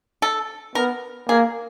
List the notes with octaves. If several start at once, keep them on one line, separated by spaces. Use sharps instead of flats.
A4
B3 A#4
A#3 G#4